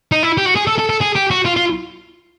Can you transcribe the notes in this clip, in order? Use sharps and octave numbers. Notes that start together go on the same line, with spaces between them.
D#4
E4
G4
F#4
G#4
A4
A4
A4
G#4
G4
F#4
F4
F4